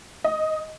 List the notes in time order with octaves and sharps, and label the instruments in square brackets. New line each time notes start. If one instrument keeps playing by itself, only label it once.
[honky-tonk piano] D#5